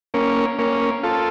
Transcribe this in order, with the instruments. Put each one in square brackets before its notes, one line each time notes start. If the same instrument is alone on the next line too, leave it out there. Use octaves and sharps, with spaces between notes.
[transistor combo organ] A#3 C#4
A#3 C#4
F4 A4